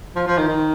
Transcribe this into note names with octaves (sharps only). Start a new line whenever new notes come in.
F3
F3
D#3
D#3